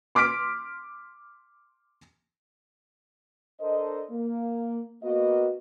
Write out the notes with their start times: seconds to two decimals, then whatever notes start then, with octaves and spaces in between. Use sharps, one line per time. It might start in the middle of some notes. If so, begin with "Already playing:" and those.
0.15 C6 D6 F6 B6 D7
3.60 D4 A4 A#4 C5 D#5
4.11 A#3
5.03 A#3 B3 F#4 D#5